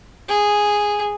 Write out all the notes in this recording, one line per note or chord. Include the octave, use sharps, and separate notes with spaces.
G#4